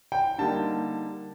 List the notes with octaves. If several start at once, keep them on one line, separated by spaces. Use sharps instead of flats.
G5
D3 G3 A#3 D#4 A5